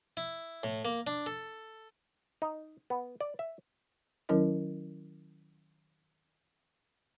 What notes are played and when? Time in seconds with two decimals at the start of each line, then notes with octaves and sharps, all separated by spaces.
0.17 E4
0.63 A2
0.85 A#3
1.07 D4
1.26 A4
2.42 D#4
2.90 B3
3.21 D5
3.39 E5
4.29 D#3 F#3 C#4 E4 A#4 D#5